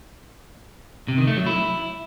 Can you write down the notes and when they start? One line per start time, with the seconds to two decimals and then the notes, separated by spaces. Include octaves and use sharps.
1.08 C3
1.18 D#3
1.27 A3
1.37 F#3
1.46 E4